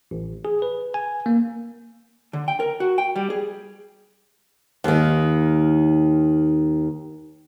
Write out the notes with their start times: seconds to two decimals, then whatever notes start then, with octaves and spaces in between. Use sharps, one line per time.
0.11 A1
0.45 G#4
0.62 B4
0.94 G#5
1.26 A#3
2.33 D3
2.48 G5
2.60 A#4
2.80 F#4
2.98 G5
3.16 G3
3.30 G#4
4.84 D#2 D#3